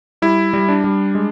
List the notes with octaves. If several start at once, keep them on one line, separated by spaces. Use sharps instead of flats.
G3 E4
G3
D4
G3
G#3